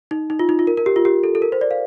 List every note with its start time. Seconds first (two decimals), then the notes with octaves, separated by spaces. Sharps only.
0.11 D#4
0.30 D#4
0.39 F4
0.49 D#4
0.59 F4
0.67 A#4
0.77 A#4
0.86 G4
0.96 F4
1.05 G4
1.24 A4
1.35 A4
1.42 A#4
1.52 C5
1.61 D5
1.71 F5